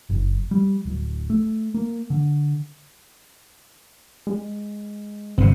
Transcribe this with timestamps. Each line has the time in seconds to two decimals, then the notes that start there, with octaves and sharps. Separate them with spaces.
0.09 F#1
0.51 G3
0.85 D1
1.30 A3
1.75 A#3
2.10 D3
4.27 G#3
5.38 G1 C3 C4